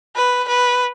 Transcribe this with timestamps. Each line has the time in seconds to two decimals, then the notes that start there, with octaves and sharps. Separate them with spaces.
0.16 B4
0.48 B4